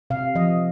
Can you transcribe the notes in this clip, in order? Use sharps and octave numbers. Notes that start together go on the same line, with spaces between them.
C3 F5
F3 D#5